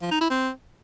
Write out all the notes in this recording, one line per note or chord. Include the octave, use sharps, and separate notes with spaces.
F3
D#4
E4
C4